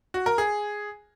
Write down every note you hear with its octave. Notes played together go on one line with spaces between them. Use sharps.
F#4
A#4
G#4